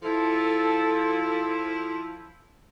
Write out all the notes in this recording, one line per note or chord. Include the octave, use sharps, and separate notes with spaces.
F3 E4 A4